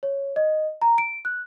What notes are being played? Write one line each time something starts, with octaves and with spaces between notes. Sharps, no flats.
C#5
D#5
A#5
D7
F#6